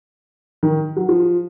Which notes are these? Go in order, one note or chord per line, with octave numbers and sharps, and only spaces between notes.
D#3
F#3
F3